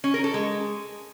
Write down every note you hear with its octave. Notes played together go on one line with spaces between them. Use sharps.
C#4
A#4
A4
G#3